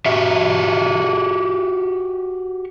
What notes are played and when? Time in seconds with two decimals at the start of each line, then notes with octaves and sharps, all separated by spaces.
0.06 F#4 G4 E5